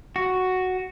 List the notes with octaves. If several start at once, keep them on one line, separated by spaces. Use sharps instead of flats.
F#4